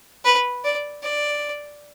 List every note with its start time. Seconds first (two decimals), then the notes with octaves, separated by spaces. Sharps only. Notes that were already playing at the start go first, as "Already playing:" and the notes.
0.25 B4
0.64 D5
1.03 D5